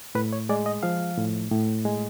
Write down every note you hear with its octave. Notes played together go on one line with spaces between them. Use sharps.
A2 B4
C#5
G#3 D5
D#5
F3 F5
A2
A2
G#3